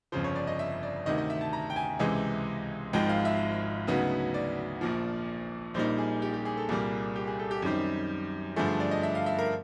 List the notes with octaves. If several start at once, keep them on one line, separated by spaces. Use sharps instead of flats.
G1 F2 C#3 F3 C5
C#5
D5
D#5
E5
D5
D2 C3 D#3 D#5
D#5
E5
A5
A#5
G5
G#5
C#2 C3 E3 G#3
G#1 G#2 F3 G#3 G5
F5
E5
D2 C#3 F#3 B3 D#4
D5
A#1 A#2 F3
A#1 A#2 G3 A#3 D#4 C5
G#4
G4
G4
G#4
A4
C2 A#2 G3 A#3 G#4
G4
G#4
A4
G4
F#2 D#3 G3 C4 D#4
G2 D3 F3 A3 G#4
G#4
D5
D#5
E5
F5
E5
A#4